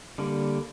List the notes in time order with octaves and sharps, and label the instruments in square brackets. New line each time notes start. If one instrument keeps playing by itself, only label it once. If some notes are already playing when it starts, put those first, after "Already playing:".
[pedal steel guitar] D3 G3 A#3